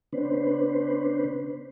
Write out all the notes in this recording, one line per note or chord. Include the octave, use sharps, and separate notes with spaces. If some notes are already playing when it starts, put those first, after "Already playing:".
C#3 B3 C#4 D4 B4 C5